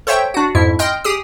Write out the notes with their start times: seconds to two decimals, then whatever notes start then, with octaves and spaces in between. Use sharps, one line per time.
0.07 A4 C5 C#5 E5 G5
0.34 D4 F#4
0.55 F2 G#2 E4
0.79 D#5 G5 C6 F6
1.04 G4 G#4 D#6